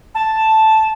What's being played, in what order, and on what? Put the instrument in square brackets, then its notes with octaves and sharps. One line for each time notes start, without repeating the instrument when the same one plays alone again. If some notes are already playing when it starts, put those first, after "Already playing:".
[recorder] A5